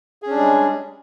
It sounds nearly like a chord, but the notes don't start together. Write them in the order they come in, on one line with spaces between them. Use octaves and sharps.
G#4 C#4 D4 G3 G#3